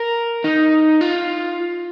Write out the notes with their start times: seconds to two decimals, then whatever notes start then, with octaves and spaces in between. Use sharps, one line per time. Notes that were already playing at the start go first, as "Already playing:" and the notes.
Already playing: A#4
0.44 D#4
1.01 F4